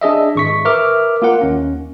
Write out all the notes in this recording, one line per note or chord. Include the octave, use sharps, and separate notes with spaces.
D4 G#4 D#5 E5
G#1 C#6 B6
A#4 B4 E5 D6 F6
A#3 F4 A#4 F#5
D#2 C#4